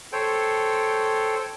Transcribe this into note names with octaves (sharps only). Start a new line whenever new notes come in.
A4 C5 C#5 G5